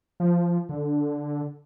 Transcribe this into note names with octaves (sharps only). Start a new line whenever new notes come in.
F3
D3